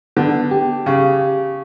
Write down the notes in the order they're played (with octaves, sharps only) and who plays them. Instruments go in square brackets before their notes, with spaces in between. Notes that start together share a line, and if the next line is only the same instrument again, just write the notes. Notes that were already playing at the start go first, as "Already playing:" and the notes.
[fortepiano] D3 [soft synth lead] B3
[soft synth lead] G4
[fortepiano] C#3